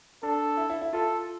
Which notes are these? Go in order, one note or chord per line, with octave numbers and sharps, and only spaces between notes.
D4 A4
E4
E4
E4
F4 A4